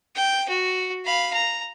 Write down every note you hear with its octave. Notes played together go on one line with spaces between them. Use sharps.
G5
F#4
F5 B5
A#5